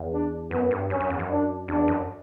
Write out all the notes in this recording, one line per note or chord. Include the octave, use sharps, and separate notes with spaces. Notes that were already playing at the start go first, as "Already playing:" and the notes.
Already playing: E2
D4
F#2 B3
G2
F#2 C#4
F#2
E2
F#2
D4
E2 D4
F#2